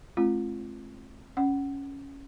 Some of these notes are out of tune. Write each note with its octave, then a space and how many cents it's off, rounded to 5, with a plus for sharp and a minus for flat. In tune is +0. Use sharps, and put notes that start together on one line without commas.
A3 -45 C4 +25 F4 -25
C#4 +0 F#5 +20